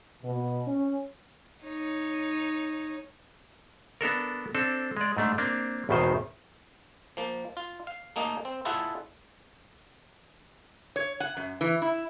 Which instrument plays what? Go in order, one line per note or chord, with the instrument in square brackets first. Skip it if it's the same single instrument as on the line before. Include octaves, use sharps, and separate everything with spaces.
[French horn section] B2
C#4
[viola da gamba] D#4 C#5
[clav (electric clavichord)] B3 D4 A4 A#4
C4 D4 A4
G#3 D5
G#2 A3 D4
A#3 C4 D4
G#1 E2 B2 D#3 C5
F3 A#3
F4
F5
A3 A#3 D#4 G#4
C4
E4 F4 G#4 A4 E5 F#5
[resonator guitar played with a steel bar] C#5
F#5
F#2
E3
E4